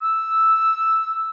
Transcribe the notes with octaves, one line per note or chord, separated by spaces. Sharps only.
E6